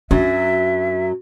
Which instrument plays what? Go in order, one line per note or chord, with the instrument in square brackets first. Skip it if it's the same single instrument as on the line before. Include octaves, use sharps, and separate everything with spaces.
[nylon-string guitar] F#2 F#3 [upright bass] D4 [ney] E5